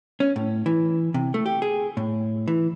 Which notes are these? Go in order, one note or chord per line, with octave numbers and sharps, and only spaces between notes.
C#4
A2
E3
C3
A3
G4
G#4
A2
E3